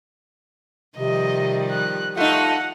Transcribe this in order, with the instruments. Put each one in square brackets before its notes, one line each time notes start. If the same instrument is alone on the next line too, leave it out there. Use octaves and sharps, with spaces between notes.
[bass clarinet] C3 [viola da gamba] D#3 F3 G3 [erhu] D#5
[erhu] F#6
[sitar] A3 D#4 [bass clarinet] F4 [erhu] F#5